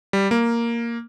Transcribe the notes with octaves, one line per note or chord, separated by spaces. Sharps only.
G3
A#3